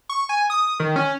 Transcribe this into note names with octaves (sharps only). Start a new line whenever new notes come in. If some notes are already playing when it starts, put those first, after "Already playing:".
C#6
G#5
D#6
D#3
C#4